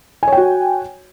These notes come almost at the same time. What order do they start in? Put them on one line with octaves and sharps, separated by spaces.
G#5 C#5 G5 F#4